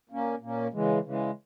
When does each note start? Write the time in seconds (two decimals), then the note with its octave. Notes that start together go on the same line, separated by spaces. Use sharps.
0.09 A#2 A#3 C#4
0.41 A#2 A#3 C#4
0.73 C#3 E3 G#3
1.05 C#3 E3 G#3